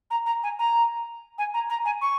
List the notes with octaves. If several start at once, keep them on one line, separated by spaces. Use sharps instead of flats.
A#5
A#5
G#5
A#5
G#5
A#5
A#5
G#5
C#6